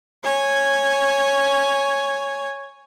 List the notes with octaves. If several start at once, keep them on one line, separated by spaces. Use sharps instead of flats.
C#5 G#5